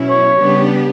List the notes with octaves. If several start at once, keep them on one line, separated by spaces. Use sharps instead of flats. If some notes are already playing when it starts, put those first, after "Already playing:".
Already playing: B2 F#3 C#4 E4
C#5
C#3 G3 B3 D4 G4